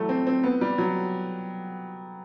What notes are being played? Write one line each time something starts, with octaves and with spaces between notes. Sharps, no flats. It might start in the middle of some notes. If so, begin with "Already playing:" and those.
Already playing: E3 F#3 G3 A3
C4
C4
B3
G3
F#3